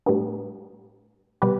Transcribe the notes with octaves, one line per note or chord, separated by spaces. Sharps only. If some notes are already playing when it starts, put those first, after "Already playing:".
A2 G3 B3 D4
B2 G3 B3 G4 B4